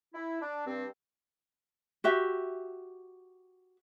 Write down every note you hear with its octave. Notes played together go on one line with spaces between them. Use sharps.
E4
D4
G2 C4
F#4 G4 E5